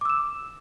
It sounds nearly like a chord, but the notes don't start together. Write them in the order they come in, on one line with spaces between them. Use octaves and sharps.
D6 E6 E7